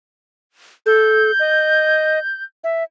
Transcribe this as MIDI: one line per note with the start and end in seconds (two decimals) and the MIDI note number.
0.86 1.31 69
0.86 2.42 91
1.40 2.19 75
2.64 2.84 76